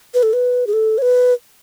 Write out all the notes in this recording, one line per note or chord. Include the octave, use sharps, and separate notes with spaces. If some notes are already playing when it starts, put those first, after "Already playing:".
B4
A4
B4
G#4
A4
C#5
B4